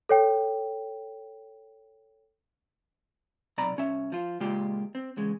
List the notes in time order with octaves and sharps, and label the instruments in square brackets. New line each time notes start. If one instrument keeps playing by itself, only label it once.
[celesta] A4 C#5 G5
[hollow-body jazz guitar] B1 C3 D5 A#5 B5
C2 C#4 E5
F3 F4
C#2 A#2 C#3 G#3 F4 G4
C4
E2 C#3 G#3